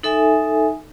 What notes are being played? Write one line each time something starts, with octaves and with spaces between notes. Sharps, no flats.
D#4 A4 E5 G#5